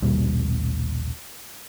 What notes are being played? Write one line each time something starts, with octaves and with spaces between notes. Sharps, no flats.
A#1 D#2 B2 G3